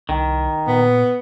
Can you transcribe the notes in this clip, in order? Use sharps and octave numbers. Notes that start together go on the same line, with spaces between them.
C2 D#3
A#2 B3